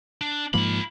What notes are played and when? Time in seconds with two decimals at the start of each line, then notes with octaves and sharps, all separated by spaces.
0.21 D4
0.54 G#2 F3 A#3 F4 B5